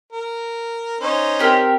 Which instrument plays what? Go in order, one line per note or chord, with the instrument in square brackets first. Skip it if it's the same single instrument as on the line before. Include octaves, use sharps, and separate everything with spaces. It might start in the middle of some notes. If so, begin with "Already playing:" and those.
[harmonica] A#4
C#4 D#4 C5
[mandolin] C4 G4 A#4